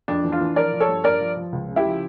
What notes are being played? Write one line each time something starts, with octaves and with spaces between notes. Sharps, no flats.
F2 D4
E3
D4 F4
E3
F3 A#4 D5
F3
A4 C#5
G2
G2 A#4 D5
F3
F3
C#2
C#3
E4 G4
F3